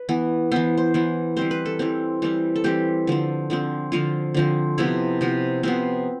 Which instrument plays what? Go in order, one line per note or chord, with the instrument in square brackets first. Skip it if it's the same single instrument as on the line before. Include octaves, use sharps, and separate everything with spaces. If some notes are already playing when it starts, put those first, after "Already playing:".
Already playing: [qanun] B4
E3 B3
E3 B3 C5
C5
E3 B3
E3 G3 C4 C5
B4
A4
E3 G3 C4
E3 G3 C4
A4
E3 G3 C4 G4
D3 F3 C4
D3 F3 C4
D3 F3 C4 F4
D3 F3 C4
C3 F3 B3 E4
C3 F3 B3
C3 F3 B3 C4